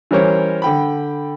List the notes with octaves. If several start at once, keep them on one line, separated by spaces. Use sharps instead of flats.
E3 G3 C#4 A#4 C5 C#5
D3 G5 B5